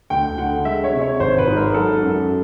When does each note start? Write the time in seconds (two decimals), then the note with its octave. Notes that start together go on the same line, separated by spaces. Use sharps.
0.10 D2 G5
0.38 D3 F#5
0.65 G#3 E5
0.84 C#5
0.93 C3
1.01 C#5
1.20 G#1 C5
1.38 B4
1.47 G#2
1.56 A#4
1.74 F#3 A4
2.02 F#2